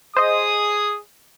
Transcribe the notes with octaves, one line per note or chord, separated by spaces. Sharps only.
G#4 C5 D#5 D#6